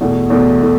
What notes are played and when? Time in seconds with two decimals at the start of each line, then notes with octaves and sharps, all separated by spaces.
0.01 E2 B2 A3
0.30 E2 B2 A3
0.62 B2 A3